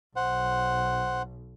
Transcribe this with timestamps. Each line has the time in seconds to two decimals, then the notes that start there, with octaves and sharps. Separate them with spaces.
0.16 B1 C5 F#5